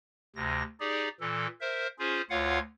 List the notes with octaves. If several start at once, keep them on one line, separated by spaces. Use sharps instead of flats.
D2 C3 A#6
D#4 G4 G#4 D5
A#2 E3 A4
A#4 C5 E5
C#4 F4 G#4 C5
D2 F4 C#5 F5 F#5